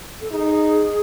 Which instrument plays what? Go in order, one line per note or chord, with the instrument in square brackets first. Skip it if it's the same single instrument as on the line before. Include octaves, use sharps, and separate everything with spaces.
[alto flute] A4
[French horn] D#4 [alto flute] G#4